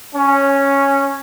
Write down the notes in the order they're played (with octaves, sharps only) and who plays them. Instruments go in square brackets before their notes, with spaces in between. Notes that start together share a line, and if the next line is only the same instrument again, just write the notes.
[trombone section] C#4